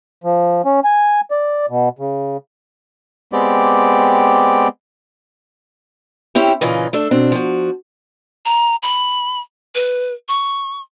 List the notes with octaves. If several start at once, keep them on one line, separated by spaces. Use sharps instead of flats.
F3
C#4
G#5
D5
B2
C#3
G#3 B3 C4 G4 D5
C4 C#4 E4 G4
A#2 C#3 E3 C#4 D#4 F4
A3 D4 A4
B2 C4 D4
F3 F#4
A#5
B5
B4
C#6